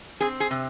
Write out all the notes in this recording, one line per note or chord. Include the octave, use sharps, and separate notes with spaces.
C4 G#4
G#4
C3